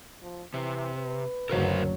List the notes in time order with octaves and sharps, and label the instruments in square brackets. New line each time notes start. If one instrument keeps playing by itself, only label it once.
[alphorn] F3
[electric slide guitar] C3 [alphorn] E3
[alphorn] B4
[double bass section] F#1 D2 F#3 [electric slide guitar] A#4 C5 F5